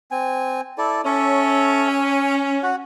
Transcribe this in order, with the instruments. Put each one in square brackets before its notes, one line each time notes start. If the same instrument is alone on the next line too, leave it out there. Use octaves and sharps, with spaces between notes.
[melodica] C4 G#5
E4 A4 D5
[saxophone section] C#4 [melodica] A4 C#5 E5
[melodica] G#5
F#4 F#5